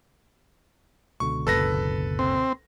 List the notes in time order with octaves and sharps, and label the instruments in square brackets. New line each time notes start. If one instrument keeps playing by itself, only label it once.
[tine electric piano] C#2 B2 D3 [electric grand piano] C#6
[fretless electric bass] F#1 [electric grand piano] A4 B4 A#6
[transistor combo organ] C4